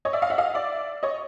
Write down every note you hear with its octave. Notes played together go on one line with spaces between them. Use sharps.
C#5 D#5
D5 E5
D#5 F5
E5 F#5
D#5 F5
D5 E5
C#5 D#5